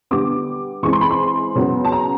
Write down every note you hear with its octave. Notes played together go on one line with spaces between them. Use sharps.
D3 G3 B3 D6
E3 G#3 C4 C#6
C6
B5
C6
C#3 F#3 B3
A5
A#5